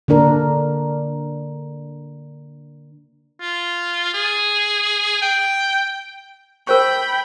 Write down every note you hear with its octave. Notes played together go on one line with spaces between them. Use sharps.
D3 A#3 D4 A#4
F4
G#4
G5
A#4 C5 G5 B5 C#6